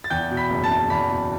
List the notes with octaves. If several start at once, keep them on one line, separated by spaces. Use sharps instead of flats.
A6
E2 G5 G6
B2
B5 B6
F#1
A5 A6
F#1
E2 B5 B6
B2